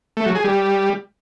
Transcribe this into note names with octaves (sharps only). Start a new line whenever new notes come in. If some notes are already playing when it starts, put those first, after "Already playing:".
A3
F#3
G#4
G3